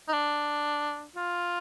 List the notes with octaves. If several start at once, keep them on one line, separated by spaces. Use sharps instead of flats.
D#4
D4
F4